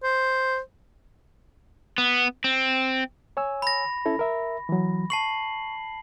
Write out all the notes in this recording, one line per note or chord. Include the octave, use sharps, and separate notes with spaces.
C5
B3
C4
C#5 G#5 E6
B5 A#6
C#4 E4 A4
A#4 E5
E3 F#3
A5 C#6 C7 F#7